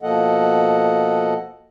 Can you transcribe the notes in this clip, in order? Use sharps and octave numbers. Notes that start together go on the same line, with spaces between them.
B2 F3 A#3 A4 D#5 F#5